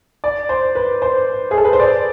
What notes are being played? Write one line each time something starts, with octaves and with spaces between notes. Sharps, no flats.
D5
C5
B4
C5
G#4
A4
B4
C5
D5